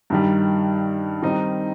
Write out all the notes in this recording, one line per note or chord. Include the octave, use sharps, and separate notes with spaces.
G2 D#3 G3
D#3 G3 C4 D#4